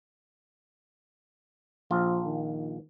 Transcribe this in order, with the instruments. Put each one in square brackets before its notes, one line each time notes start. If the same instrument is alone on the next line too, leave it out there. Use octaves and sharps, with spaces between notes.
[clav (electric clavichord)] A#1 F4 [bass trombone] F3
[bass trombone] D#3